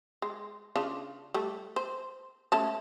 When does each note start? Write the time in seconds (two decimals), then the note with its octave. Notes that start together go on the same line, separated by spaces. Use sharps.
0.22 G#3
0.76 C#3 D4 F4
1.34 G3 A3
1.76 C5
2.52 A3 C#4 A5